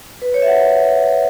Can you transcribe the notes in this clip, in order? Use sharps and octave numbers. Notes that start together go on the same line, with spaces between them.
B4
C#5
E5
F#5